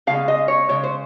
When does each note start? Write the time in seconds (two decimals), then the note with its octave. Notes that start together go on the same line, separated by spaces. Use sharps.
0.07 C#3 G#3 F5
0.28 D#5
0.48 C#5
0.69 C#3 G#3 C#5
0.84 C5